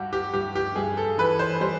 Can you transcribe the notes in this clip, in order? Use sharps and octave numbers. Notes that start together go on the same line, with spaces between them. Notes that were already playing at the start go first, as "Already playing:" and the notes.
Already playing: G2 G3 F#4 G4
G4
G2 G4
G4
G2 G#4
A4
E3 B4
C5
G3 C5